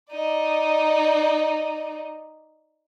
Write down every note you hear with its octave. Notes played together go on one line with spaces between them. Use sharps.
D#4 D5